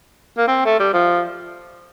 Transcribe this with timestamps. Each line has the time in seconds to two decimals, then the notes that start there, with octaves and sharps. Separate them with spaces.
0.38 A#3
0.48 C4
0.66 A3
0.80 G3
0.94 F3